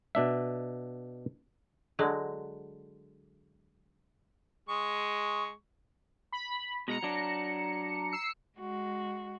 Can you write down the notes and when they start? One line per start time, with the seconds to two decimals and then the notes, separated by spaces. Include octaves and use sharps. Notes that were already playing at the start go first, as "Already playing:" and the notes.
0.15 B2 D4 E5
1.99 D3 F#3 G#3
4.69 G#3 C#6
6.32 B5
6.88 B2 G#3 A#5 C#7
7.03 F#3 D4
8.12 E6 C7 C#7
8.58 G#3 F#4